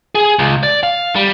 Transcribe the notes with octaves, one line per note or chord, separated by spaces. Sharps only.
G#4
C#2
D5
F5
G3